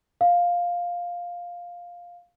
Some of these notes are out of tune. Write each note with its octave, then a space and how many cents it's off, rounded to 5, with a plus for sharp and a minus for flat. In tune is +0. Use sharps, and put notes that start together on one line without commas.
F5 +5